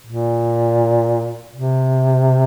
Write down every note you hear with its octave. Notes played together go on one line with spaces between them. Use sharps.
A#2
C3